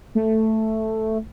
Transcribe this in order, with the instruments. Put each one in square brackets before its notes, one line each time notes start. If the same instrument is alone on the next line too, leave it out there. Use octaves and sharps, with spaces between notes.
[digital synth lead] A3